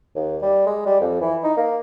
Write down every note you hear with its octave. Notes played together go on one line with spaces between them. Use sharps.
D#2
G3
G#3
G3
F2
E3
D#4
A#3